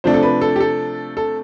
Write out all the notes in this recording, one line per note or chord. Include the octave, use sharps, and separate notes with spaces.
C3 F3 A3 D4 C5
A4
B4
A4
G4
A4
A4